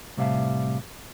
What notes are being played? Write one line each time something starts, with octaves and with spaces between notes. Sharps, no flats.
A2 C3 G3 E5 F5 A5